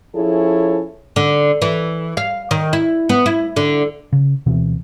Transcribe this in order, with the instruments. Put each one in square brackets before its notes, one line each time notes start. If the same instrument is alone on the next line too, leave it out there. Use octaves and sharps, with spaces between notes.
[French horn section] F3 C#4 E4 G#4 A4 C#5
[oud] D3
E3
F5
D#3
E4
B3
E4
D3
[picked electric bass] C#3
D2 B2 E3 C4